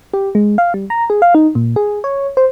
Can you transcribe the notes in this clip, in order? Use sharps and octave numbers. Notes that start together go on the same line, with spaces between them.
G4
G#3
F5
G3
A#5
G#4
F5
D#4
A#2
G#4
C#5
C5